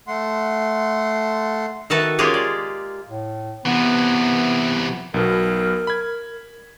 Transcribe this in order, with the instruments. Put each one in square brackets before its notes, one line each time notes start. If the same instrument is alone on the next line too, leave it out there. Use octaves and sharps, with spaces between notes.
[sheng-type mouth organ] A3 F#5 C6
[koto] D#3 F#4 A4 B4 E5 A5
G#3 A#3 C#4 F4 G4 G#4
D5
[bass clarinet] A2
[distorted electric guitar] C3 E3 [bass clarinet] B3
[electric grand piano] B1 B2 [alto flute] A#4
[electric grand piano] B5 G#6